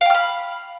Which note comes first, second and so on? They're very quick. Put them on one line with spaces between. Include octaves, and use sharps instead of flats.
F5 G5 F6 B5